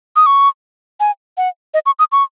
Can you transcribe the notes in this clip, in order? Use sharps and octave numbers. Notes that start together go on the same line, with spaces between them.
D#6
C#6
G#5
F#5
D#5
C#6
D#6
C#6